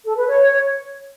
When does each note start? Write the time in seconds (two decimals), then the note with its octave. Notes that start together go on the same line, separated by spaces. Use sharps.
0.05 A4
0.16 B4
0.28 C#5